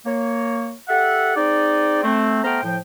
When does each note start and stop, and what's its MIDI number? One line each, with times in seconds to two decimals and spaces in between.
0.05 0.73 58
0.05 0.73 73
0.88 1.36 67
0.88 1.36 69
0.88 1.36 76
0.88 1.36 78
1.36 2.01 60
1.36 2.01 63
1.36 2.01 68
1.36 2.01 74
2.03 2.42 57
2.03 2.42 60
2.44 2.60 57
2.44 2.60 59
2.44 2.60 72
2.44 2.60 79
2.44 2.60 82
2.44 2.60 89
2.63 2.76 45
2.63 2.76 53
2.63 2.76 79